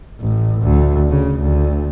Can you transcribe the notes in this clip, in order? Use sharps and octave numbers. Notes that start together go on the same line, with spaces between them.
A1
D2
C#3
D2